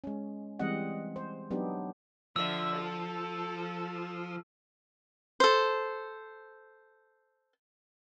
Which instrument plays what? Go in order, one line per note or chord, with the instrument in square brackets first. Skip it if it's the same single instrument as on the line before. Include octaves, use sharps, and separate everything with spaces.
[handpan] G#3 C#4
E3 G3 G#3 C4 D#5 F#5
C5
F#3 B3 D4 D#4 G4
[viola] D3 E5 [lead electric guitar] F3 [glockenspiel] E6
[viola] A4
[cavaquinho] A4 C5